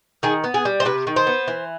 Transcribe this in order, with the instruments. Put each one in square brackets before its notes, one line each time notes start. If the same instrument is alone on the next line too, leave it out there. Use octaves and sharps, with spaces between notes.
[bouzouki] D#3 G#4
B3
G#4
G3
C5
C3 B4
D#3
C5
B3
E3